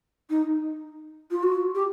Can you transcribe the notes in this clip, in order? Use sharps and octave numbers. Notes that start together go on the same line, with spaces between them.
D#4
F4
F#4
G4